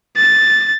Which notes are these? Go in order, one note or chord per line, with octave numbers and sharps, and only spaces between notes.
A6